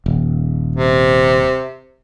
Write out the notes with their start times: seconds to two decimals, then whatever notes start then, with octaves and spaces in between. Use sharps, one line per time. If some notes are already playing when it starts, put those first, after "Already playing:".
0.06 D#1
0.76 C3